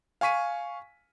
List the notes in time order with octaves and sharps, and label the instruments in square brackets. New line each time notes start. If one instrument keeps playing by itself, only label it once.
[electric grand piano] F5 G#5 C#6 B6 D#7